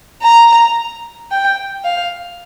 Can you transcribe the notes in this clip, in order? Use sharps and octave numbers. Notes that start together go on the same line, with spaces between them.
A#5
G5
F5